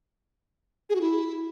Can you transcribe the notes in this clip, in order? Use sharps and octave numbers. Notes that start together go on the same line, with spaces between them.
G#4
F#4
E4